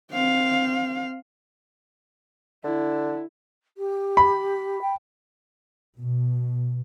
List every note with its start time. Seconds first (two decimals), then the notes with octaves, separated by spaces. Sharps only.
0.12 C4 F5
2.64 D3 E4
3.77 G4
4.17 B5
4.81 G5
5.98 B2